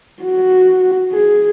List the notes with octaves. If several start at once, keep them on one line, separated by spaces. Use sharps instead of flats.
F#4
G#4